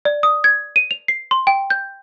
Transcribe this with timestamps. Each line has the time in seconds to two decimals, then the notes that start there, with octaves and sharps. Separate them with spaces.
0.05 D5
0.23 D#6
0.44 G#6
0.76 D#7
0.91 F7
1.08 C7
1.31 C6
1.47 G5
1.70 G6